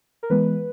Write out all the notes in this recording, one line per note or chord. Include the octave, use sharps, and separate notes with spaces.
A#4
E3 G#3 B3 B4